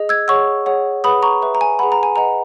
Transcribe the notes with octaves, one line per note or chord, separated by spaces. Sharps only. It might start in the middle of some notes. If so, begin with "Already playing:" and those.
Already playing: G#4 D#5
E6 G#6
G#4 C#5 F#5 C#6 E6
G#4 C#5 F#5
G#4 B4 F#5 B5 D#6
A#5 C#6
B4 E5
A#5
G#5
G#4 B4 F#5 B5
A#5
G#5
B4 D#5 F#5 A#5